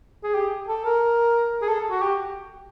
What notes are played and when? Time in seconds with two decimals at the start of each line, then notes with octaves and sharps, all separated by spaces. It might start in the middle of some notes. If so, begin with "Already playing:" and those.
0.24 G#4
0.35 G4
0.68 A4
0.85 A#4
1.62 G#4
1.68 A4
1.91 F#4
2.02 G4